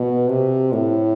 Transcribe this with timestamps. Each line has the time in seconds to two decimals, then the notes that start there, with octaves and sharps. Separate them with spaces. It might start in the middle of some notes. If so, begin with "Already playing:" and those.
Already playing: B2
0.28 C3
0.72 A2